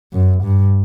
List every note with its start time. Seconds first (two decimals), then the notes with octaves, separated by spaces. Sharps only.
0.13 F#2
0.43 G2